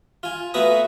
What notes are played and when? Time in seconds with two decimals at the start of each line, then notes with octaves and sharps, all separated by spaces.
0.23 F4 G#5
0.54 A3 B3 F#4 A#5 D#6